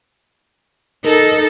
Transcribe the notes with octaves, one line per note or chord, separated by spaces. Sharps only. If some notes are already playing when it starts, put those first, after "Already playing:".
D#4 A4 A#4